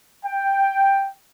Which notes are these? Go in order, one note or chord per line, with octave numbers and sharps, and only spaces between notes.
G5